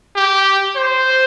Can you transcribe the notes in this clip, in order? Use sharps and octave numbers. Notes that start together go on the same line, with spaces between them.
G4
C5